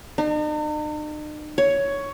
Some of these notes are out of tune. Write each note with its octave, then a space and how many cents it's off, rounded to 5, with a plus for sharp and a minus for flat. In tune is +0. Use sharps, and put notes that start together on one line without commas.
D#4 -45
C#5 +10